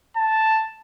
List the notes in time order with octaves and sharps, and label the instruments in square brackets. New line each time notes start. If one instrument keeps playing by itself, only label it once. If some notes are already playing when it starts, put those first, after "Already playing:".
[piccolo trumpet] A5